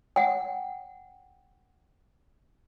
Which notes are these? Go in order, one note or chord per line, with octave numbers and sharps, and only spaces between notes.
F#5 G5